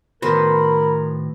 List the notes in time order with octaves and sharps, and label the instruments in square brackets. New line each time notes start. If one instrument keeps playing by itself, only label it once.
[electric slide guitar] A2 D#3 F#4 [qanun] B3 C5 [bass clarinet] A#4 [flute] B5